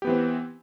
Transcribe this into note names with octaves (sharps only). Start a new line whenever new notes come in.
E3 B3 C4 G4